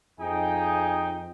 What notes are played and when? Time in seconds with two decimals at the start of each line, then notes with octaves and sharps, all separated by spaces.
0.20 F2 D#4 G#4 G5